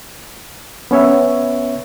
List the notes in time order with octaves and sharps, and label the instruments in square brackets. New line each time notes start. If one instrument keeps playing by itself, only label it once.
[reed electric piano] B3 C#4 C#5 E5